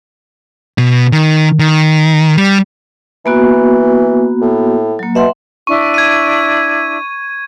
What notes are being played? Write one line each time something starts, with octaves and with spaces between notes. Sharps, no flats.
B2
D#3
D#3
G3
E3 A#3 B3 F#4
A2
F#3 A#3
B2 E5 F#5 C6
D4 E4 C#6
G#6 D#7